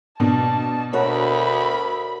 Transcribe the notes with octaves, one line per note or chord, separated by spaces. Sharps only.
B2 D4 A5
D2 F#4 A#4 C#5 B5